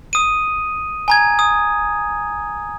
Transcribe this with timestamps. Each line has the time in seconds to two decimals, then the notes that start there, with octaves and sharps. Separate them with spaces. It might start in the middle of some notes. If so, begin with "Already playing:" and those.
0.13 D#6 D#7
1.08 G#5 A#5 G#6
1.39 D#6